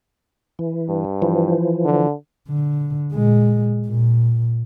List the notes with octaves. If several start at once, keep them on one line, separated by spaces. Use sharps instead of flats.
E3
G2
E3 F3
D3
D3
A#2 G#3
A#2